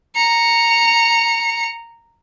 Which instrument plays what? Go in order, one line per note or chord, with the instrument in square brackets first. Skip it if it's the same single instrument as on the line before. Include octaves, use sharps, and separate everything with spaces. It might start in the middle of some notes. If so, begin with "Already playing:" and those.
[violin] A#5 C#7